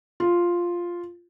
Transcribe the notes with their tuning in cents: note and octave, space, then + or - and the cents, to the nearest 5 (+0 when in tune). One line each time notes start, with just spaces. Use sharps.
F4 +0